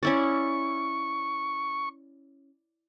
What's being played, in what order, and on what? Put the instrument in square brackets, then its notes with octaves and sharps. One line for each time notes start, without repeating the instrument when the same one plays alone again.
[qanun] C#4 E4 D5 [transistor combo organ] C#6